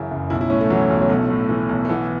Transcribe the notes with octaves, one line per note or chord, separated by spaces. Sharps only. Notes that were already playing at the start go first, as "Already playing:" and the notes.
Already playing: F#2 C#3 E3 E4
F#1
B1 E4
E4
A2 C#4
A3
E3 F#3
B1
F#3
B1 A3
A2
E3
B1
A3
E3 B3